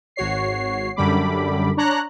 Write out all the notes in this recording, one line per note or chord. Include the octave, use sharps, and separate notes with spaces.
G#1 F#4 C#5 C7
F#2 D3 G3 B5 D6
D4 C#5 A#5 F#6